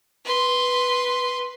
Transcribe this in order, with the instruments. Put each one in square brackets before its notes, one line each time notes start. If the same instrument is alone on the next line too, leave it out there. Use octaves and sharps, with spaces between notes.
[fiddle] B4 C6